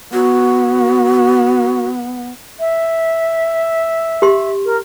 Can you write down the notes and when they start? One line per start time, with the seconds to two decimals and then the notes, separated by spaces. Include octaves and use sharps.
0.13 B3 F#4
2.60 E5
4.22 G4 C6
4.65 A#4